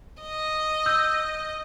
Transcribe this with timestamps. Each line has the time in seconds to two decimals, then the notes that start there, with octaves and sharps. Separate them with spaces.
0.22 D#5
0.86 E6 G6